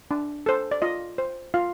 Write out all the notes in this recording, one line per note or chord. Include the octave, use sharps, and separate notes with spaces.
D4
A4 C5
D5
F4 D#5
C5
F4 F5